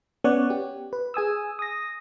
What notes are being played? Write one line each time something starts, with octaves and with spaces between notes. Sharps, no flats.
B3 C#4 C#5 D5 F#5
G4
B4
G#4 G#5 D#6 E6
D#6 A#6